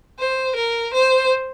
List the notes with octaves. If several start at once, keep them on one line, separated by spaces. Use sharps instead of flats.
C5
A#4
C5